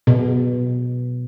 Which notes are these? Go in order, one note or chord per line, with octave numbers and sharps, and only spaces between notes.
B2